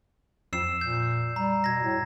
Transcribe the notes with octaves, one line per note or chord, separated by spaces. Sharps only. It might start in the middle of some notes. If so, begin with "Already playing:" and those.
F2 E6 C7 E7
A#2 G6
G3 A#5
B2 G#6 A#6
A2